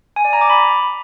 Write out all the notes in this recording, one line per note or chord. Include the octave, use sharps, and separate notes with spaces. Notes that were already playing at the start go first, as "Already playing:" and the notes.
G#5
D5
A#5
D6
B5